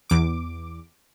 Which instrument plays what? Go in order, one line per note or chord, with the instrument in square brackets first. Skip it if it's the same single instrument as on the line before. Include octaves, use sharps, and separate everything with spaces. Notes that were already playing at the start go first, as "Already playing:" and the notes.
[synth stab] E2 D6